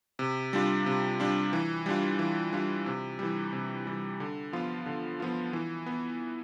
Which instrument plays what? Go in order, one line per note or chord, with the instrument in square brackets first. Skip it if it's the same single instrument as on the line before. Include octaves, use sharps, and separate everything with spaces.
[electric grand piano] C3
G3 D4 F4
C3
G3 D4 F4
E3
G3 D4 F4
E3
G3 D4 F4
C3
E3 G3
C3
E3 G3
D3
F3 B3 F4
D3
F3 B3 F4
E3
B3